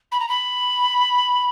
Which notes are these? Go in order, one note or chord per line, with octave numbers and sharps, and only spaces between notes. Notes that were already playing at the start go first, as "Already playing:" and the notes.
B5
A#5
B5